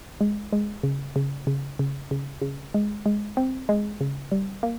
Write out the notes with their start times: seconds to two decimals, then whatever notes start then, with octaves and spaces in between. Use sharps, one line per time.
0.21 G#3
0.53 G#3
0.83 C#3
1.16 C#3
1.47 C#3
1.79 C#3
2.11 C#3
2.42 C#3
2.74 G#3
3.06 G#3
3.37 C4
3.69 G#3
4.01 C#3
4.32 G3
4.63 A#3